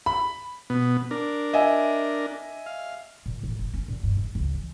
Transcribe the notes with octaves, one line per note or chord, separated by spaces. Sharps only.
B5
B2 B3
D4 A#4
D#5 E5 G#5
F5
A#2
A2
A1
C#4
A#2
G2
G#2
C#2
E3